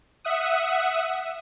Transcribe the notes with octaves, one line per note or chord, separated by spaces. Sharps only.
E5 F#5 D#6